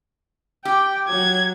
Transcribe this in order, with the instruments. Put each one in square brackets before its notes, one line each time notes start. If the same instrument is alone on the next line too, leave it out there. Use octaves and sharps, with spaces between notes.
[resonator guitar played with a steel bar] G4 [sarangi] G5
[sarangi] F#3 [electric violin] G#6